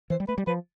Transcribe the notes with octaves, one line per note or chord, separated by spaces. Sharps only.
E3 C5
G3
A3 B4
G3
F3 B4